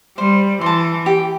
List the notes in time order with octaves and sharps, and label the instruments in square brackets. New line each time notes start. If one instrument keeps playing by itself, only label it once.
[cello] G3 [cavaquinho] C5
[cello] E3 [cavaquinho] A5 C6
[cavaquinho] G4